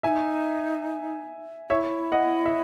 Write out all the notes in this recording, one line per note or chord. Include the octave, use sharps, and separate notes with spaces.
D#4 E4 E5 G#5
E4 C#5 E5
D#5 F#5
E5